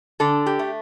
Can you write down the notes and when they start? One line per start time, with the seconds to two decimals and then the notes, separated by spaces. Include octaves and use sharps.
0.20 D3 A4
0.46 G4
0.59 A3